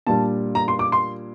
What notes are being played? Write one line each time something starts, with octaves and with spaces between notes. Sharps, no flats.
A#2 G3 D4 A5
A#5
C6
D6
C6